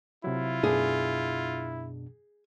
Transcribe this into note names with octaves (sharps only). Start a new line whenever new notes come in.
C3 F#3 E4 F4
F#2 B2 D4 G#4